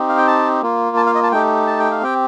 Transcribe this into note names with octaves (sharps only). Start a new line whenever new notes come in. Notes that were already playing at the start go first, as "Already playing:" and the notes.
Already playing: C4 D#4 G4
F5
G5
A5
A#3 F4
A5
F5
D#5
A5
A3 D#4 G4 G5
A5
G5
F5
C4 G4 G5